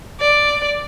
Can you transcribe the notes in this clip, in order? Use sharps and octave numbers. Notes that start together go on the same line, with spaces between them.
D5